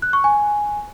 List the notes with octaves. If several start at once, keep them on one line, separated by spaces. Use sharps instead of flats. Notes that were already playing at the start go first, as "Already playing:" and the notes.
F#6
C#6
G#5